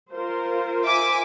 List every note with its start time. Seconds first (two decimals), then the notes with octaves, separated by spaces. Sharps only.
0.11 F4 A#4 C5
0.85 E5 G#5 D6